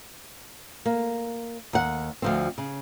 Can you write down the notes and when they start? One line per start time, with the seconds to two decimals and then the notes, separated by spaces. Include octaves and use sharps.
0.86 A#3
1.73 D#2 F#5
2.22 D2 F3 C4
2.58 C#3